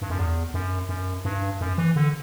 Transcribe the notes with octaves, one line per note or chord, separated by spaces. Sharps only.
G2
F#2
E2
F#2
F#2
G2
F#2
E3
D3